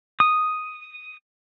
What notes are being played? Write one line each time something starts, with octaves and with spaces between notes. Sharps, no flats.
D#6